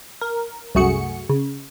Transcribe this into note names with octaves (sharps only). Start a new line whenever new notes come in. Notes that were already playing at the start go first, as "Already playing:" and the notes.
A#4
C2 F#2 A3 F#4 G#4 C#7
C#3